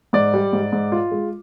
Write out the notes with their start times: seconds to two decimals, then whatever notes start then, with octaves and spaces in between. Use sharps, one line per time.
0.13 G#2 D5
0.34 G3
0.53 G#2
0.72 G#2
0.92 F4
1.11 G#3